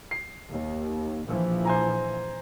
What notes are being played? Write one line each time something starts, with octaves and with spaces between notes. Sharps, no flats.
C7
D#2
A#1 E3 F3
C5 G#5 A#5